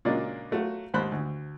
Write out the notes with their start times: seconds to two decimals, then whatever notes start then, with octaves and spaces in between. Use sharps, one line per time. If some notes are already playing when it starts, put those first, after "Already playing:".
0.05 A#2 C#3 F#3 G#3 A#3 D4
0.51 F#3 A3 F4 F#4
0.94 D#2 G#2 C5 B5 F#6
1.12 D2